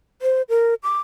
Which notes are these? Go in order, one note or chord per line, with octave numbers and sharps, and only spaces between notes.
C5
A#4
D6